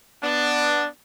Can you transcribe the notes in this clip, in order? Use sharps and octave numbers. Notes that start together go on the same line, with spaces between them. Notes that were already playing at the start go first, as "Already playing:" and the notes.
B3 D4